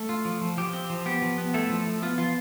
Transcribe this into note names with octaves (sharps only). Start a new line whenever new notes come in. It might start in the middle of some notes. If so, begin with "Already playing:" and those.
Already playing: A3 A4
F4
F3
F3
F3 G4
C4
F3
B3 G4
F3
B3
A3 E4 A4
F3
F3
B3 F4
F3 F4